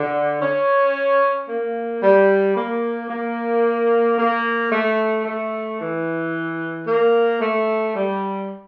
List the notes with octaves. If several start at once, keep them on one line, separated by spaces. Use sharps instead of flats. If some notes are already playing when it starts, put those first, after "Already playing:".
Already playing: D3
C#4
A#3
G3
A#3
A#3
A#3
A3
A3
E3
A#3
A3
G3